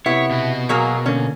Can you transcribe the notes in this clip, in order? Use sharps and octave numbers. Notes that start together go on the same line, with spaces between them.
C3 B3 E4 C#5
B2 F#4
F#3 A#3 G#4 A#4 A#5 C#6
D3 A#3 C#4